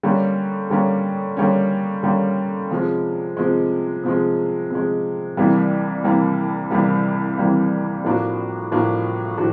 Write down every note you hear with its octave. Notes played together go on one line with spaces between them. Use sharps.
D3 G3 A#3 C#4
D3 G3 A#3 C#4
D3 G3 A#3 C#4
D3 G3 A#3 C#4
C3 F3 G#3
C3 F3 G#3
C3 F3 G#3
C3 F3 G#3
C2 C3 E3 G3 A#3
C2 C3 E3 G3 A#3
C2 C3 E3 G3 A#3
C2 C3 E3 G3 A#3
A2 F3 A#3 D4 F#4
A2 F3 A#3 D4 F#4
A2 F3 D4 F#4